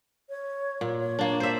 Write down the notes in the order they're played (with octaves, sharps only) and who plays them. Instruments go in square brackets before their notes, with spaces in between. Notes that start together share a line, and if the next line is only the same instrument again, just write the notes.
[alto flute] C#5
[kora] A#2
[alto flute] C#5
[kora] A#3 D4
C5 E5